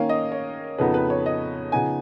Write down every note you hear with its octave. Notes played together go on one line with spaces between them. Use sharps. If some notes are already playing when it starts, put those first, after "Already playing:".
Already playing: D#3 A#3 C#4 F5
D#5
C#5
F2 C#3 F3 B3 D#4 B4
B4
C#5
D#5
C#3 F3 B3 D#4 G#5